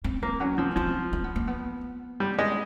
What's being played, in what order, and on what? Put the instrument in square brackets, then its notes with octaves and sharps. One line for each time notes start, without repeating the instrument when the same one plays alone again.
[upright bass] C4
[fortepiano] A#3 [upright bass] C4
[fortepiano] F#3 [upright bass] C#4
[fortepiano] F3 [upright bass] C4
[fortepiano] F3 [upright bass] C4
[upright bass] C4
B3
A#3
B3
[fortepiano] G3
G#3